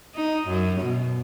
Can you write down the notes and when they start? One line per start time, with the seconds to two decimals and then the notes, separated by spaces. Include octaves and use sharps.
0.15 D#4
0.48 F#2
0.81 B2